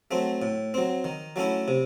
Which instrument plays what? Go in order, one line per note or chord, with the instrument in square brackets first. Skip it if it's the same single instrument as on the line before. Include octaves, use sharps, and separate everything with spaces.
[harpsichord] F#3 A3 C4
A2
F#3 C4
D#3
F#3 A3 C#4 E4
C3